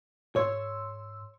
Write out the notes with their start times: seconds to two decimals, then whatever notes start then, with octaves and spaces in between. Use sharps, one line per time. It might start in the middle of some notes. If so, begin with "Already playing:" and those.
0.36 G#2 C#5 C6 E6